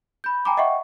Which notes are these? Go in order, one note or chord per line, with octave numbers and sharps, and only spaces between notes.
B5 G6
G5 G#5 A#5 B5 D6
D#5 E5 F#5 G5 C#6